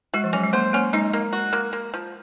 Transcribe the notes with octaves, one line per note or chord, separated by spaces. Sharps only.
G#3 F#4
F3
F#3 C#4
G#3
A#3 C5
A#3 C#4
G#3 D#4
A#3
F#4
A#3
A#3
F3